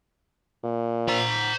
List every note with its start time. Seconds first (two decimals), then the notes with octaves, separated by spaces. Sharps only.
0.64 A#2
1.08 C5 A#5